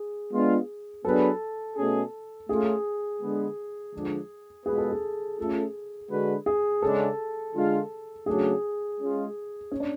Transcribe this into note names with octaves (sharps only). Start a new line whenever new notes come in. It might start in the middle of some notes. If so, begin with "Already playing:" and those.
Already playing: G#4
G#3 B3 D4 F4
F#3 B3 D4 G#4 A4 B4
B2 A3 C#4 G#4
A3 C#4 F4 G#4
D3 G#3 B3
D3 F3 G#3 D4
B2 G#3 B3 F4 G#4 B4
A4
G#4
A3 C#4 F4 A4
D3 G#3 D4 F#4 B4
G#4
C#3 G#3 D4 A4
D3 G#3 D4 F4
C#3 F#3 A3 D4 G#4
G#3 C#4 F4
C#4
D4